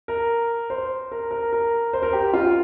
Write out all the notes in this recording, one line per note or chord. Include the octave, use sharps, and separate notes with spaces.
A#4
C5
A#4
A#4
A#4
C5
A#4
G4
F4